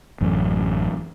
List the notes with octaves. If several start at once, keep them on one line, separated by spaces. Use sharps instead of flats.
A1 F#2